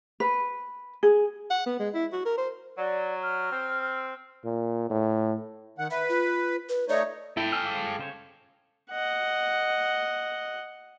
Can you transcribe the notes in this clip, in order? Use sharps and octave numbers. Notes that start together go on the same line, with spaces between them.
B4
G#4
F#5
B3
G#3
E4
F#4
A#4
C5
F#3 D5
F6
C4
A#2
A2
D#3 F#5
B4 E5
F4
B4
A3 D#4 C#5 D5
E4 A4 G5
G#5 E6 F6
G#3 F5 D6
C#3 C5 C#5
D#5 F#5